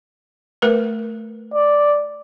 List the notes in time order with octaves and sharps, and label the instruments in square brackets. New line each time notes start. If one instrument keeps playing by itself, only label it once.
[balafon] A3 A#4 B4
[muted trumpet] D5